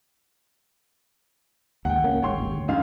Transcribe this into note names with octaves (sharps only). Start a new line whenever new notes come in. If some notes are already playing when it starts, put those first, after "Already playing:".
D#2 G#2 F#5 G5
C#2 A#3 C#4
G#1 G#2 C#5 G5 C6
G#1 D#2
D2
F#2 D#3 F5